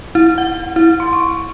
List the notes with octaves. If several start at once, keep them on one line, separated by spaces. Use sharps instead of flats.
E4
F#5
E4
C6
C#6